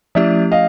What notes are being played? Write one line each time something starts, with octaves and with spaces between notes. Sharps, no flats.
F3 A3 C#4 E4 G4 D5 E5
D#5 F5